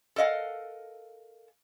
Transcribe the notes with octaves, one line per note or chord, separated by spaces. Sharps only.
A4 A#4 D#5 F5 F#5